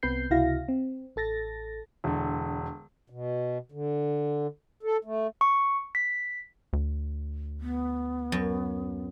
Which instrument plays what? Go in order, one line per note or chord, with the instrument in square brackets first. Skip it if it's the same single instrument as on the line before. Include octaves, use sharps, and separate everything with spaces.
[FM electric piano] C2 B3 C4 B4 G6 C7
C#2 C3 E4 F#4 F5 A#6
C4
A1 A4 A6 A#6
[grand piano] E1 D3
[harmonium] B2
D3
A4
A3
[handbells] C#6
B6
[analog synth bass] D2
[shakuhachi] B3
[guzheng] F#2